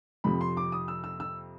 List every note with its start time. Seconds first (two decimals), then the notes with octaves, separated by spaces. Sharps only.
0.24 F2 C3 F3 B5
0.41 C6
0.57 D6
0.72 D#6
0.88 E6
1.04 E6
1.20 E6